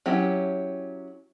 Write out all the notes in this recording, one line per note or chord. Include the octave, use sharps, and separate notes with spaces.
F#3 C#4 E4 G4